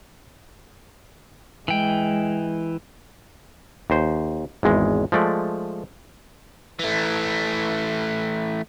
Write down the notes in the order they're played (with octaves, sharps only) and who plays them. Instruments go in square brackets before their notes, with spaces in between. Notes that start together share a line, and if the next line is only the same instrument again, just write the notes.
[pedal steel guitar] E3 G5 [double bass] G#3
[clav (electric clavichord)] D#2 C5
G#1 E2 G#3
F3 G#3 A3 D5
[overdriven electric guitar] E3 A3